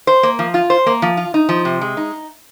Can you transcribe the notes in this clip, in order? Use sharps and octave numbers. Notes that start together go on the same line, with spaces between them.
C5
A#3
F3
F4
C5
A#3
F3
F4
D#4
F3
C3
G#3
D#4